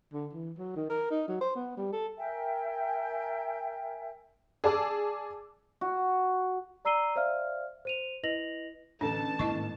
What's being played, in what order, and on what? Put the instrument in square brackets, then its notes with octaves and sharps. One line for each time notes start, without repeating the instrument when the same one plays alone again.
[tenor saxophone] D3
E3
F#3
D#3
A#4
D#4
F#3
C5
B3
G3
A4
[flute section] A#4 E5 G5 G#5
[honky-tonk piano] G#4 D5 A5 D6 E6
[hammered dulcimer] F#4
[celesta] D5 A#5 E6 C7 D#7 G7
C5 D5 E5 F5 F6
C5 D#7 F7
E4 B4 D#5 A#6 F7 F#7
[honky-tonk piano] A1 D3 A4 [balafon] D4 [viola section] A5
[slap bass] G#2 D#3 A#3 [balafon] E4 D#5 C#6